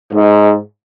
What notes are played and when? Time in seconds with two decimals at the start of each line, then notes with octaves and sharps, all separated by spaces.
0.13 G#2